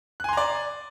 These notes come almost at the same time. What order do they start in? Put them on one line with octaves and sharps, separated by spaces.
F#6 G#5 C6 A#5 D5